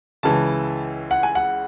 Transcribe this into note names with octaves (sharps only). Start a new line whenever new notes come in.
C#2 C#3 E3 A5
F#5
G#5
F#5